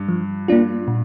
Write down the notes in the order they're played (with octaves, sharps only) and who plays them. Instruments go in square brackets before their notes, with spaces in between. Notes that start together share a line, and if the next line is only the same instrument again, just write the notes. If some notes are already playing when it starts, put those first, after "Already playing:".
Already playing: [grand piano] G2
[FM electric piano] F3
A#3 D4 F4
A#2